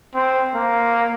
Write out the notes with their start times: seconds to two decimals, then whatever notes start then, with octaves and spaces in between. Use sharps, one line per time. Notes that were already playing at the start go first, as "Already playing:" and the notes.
0.14 C4
0.54 A#3